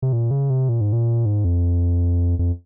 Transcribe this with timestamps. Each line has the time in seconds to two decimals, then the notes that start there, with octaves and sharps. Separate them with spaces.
0.02 C3
0.13 A#2
0.31 C#3
0.50 C3
0.69 A#2
0.81 G#2
0.93 A#2
1.26 G#2
1.45 F2
2.39 F2